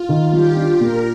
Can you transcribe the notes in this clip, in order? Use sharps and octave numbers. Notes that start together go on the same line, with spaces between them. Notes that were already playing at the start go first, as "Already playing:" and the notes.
Already playing: F4
D#3
G3 G4
D4
A#2 A#4